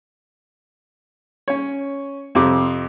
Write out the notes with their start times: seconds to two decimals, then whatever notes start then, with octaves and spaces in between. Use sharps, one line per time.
1.48 C#4 C#5
2.35 F2 C3 D6